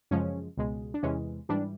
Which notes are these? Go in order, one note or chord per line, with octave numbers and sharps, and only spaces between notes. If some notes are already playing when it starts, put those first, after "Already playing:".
F#2 C#3 F3 G#3 C#4
C#2 B2 G#3
D4
E2 C3 E3 G#3 C#4
G#2 E3 G3 D4